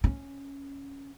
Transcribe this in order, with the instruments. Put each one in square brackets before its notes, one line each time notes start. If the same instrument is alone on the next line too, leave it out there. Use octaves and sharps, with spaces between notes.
[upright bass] C#4